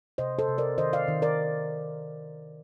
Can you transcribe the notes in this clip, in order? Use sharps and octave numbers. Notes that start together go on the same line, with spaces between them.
C3 C5 D#5
A4 C5
C3
A#4 D5
D#3 C5 D#5
D5 F5
D#3
A#4 D5